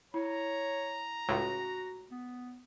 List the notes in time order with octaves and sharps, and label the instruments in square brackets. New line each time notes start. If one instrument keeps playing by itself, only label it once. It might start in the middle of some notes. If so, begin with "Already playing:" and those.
[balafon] E4 [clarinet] C#5 [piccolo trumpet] A#5
[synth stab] C#2 A2 [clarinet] F#4
[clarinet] B3